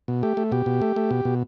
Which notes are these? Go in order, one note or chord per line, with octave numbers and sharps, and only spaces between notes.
B2
A3 G4
A3
B2 G4
B2
A3
A3
B2
B2